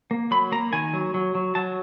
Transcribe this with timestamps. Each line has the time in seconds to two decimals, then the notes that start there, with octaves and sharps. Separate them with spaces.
0.11 A#3
0.31 F#3 B5
0.52 A#3 A#5
0.73 D#3 G#5
0.93 F#3
1.14 F#3
1.35 F#3
1.55 F#3 A5